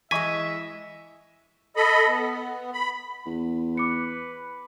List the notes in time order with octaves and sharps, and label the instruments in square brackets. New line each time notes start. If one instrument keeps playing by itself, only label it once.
[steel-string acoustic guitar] E3 G#3 [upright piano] D#5 C#6 B6 [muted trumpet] E5 [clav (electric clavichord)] G#5
[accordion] A4 D#5 B5
B3
B5
[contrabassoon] E2
[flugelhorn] B4 [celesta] D6 C#7